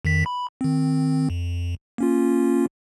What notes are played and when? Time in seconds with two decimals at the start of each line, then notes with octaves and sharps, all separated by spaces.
0.05 F2 D#3 B6
0.26 B5
0.61 D#3 C4
1.30 F2
1.98 A#3 C#4 F4